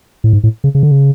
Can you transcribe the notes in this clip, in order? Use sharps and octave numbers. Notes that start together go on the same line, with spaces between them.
A2
G#2
A2
C#3
C#3
D3
C#3